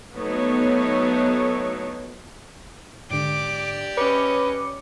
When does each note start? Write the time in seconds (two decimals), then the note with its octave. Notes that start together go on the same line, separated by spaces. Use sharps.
0.14 F#3 A3 B3 D#4 C#5
3.11 G#2 D3 G4 D5 D6
3.97 C#4 B4 C#5 D#5 D6 C#7